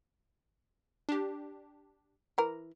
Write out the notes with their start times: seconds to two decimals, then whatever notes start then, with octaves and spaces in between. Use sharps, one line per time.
1.09 D4 G4
2.38 E3 A#4